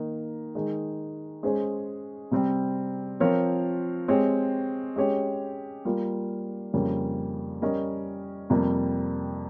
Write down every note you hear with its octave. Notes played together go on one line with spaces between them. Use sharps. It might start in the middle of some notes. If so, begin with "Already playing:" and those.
Already playing: D#3 A#3 D#4
D#3 G#3 D#4
G#3 C#4 G#4 C5
C3 G3 C4
F3 C4 F4 A#4 C#5
G#3 C4 G4 C#5
G#3 C#4 G4 C#5
G3 A#3 F4
F2 C#3 G3 A#3 C#4
G3 C#4 G4 A#4 D#5
F2 C3 G3 A#3